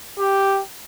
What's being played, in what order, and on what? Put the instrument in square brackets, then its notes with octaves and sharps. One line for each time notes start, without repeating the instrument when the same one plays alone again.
[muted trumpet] G4